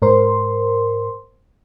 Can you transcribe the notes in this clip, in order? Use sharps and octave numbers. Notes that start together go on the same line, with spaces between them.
G#2 A#4 C5 C6